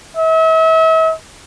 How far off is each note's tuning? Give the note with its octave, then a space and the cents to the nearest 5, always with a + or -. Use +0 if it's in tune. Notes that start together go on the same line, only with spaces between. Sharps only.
E5 -40